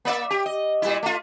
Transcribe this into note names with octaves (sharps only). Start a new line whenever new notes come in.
A#3 D5 E5
G4
D#5
A#2 G3 E4
A3 F4